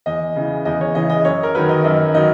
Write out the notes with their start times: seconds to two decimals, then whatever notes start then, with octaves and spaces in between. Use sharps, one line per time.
0.06 E2 D#5
0.36 C#3 E3
0.65 E2 D#5
0.81 C#5
0.95 C#3 E3 D#5
1.10 D#5
1.24 F#2 C#5
1.43 A#4
1.55 D#3 F#3 B4
1.69 D#5
1.84 F#2 D#5
2.14 D#3 F#3 D#5